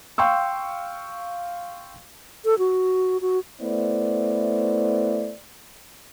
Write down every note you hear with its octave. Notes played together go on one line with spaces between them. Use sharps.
F5 G5 C6 C#6 E6
A4
F#4
F#4
A3 B3 E4 C5 D5